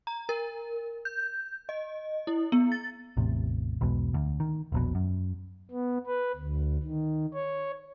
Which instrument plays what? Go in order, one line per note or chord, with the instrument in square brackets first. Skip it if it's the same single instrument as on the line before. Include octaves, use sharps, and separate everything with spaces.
[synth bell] A#5
A#4
G6
D#5
E4
B3
A6
[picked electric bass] A1 E2 A2 C3
B1 E2 G#2 B2
D2
D#3
E1 A#1 B2
F#2
[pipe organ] B3
B4
D2
D#3
C#5